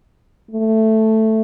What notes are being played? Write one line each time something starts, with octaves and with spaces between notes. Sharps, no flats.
A3